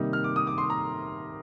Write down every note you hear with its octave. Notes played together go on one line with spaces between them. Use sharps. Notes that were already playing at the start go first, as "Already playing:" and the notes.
Already playing: C3 D#3 G3 A#3 D#4
F6
D6
D#6
D6
C6
A#5